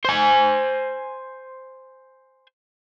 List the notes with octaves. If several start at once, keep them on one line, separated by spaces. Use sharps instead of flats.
C5 G#5